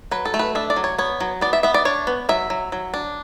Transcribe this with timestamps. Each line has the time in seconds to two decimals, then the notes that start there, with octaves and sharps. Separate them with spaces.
0.11 F#3 B4
0.25 A4
0.34 A3
0.39 B4
0.55 D4 E5
0.70 D5
0.76 F#3
0.84 C#5
0.98 B3 C#5
1.20 F#3
1.41 B3 D5
1.53 E5
1.63 B3 E5
1.74 D5
1.85 D4 C#5
2.07 B3
2.29 F#3 E5
2.50 F#3
2.72 F#3
2.94 D4